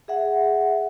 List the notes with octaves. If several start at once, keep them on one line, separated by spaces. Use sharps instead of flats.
G#4 E5 F#5